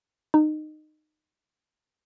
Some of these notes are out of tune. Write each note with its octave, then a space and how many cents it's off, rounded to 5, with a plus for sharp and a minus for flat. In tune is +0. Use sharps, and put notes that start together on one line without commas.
D#4 -20